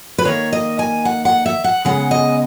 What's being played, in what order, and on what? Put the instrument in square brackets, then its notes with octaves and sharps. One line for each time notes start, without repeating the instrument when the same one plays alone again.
[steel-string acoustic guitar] B4
D#3 A#3 C#5
D#5
G#5
F#5
F#5
E5
F#5
C#3 G#3 B3 F#5
D#5